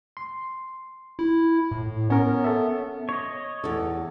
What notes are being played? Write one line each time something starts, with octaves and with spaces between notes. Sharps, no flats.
C6
E4
A2
B3 C#4 A#4
A4 C#5 E5
C#5 D#5
E2 A4